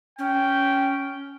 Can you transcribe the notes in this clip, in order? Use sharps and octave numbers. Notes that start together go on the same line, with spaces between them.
C#4 G5